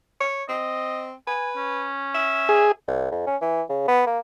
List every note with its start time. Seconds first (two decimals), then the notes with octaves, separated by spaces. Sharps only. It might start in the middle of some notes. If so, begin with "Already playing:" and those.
0.20 C#5
0.49 C4 D#5
1.27 B4 G#5
1.57 C#4
2.14 E5
2.49 G#4
2.87 C2
3.11 F2
3.27 C#4
3.41 E3
3.69 C#3
3.88 B3
4.07 A#3